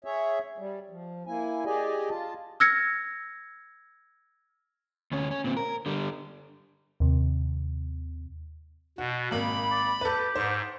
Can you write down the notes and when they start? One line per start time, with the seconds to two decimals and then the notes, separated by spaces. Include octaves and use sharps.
0.05 G#4 C#5 E5
0.58 G3
0.90 F3
1.27 A#3 E4 G#5
1.65 G4 G#4 D5 D#5 G#5
2.10 F4 A5
2.60 E6 F6 G#6 A#6 C#7
5.12 D2 C#4
5.31 C#4
5.44 A#2 C4
5.57 A#4
5.86 D3 G3
7.00 D#2 C3
8.98 B2 F#4
9.31 G#1 A#3 B5
9.71 D5
10.01 G4 A4 B4
10.36 G#2 C5